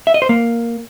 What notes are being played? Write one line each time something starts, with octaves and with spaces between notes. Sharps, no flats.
E5
D#5
C5
A#3